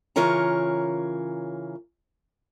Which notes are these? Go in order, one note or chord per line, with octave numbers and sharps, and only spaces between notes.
C#3 E3 F4 A#4 C#5 A#5